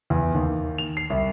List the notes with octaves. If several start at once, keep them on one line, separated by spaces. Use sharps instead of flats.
E2
D#2
F7
C7
C2